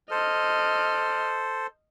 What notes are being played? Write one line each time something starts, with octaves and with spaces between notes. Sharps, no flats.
A4 C5 D#5 F6